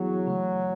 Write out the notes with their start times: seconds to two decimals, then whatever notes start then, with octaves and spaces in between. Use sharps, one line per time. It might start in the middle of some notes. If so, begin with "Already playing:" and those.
Already playing: E3 F#3 B3 E4 G#4
0.27 C#3 E3 A3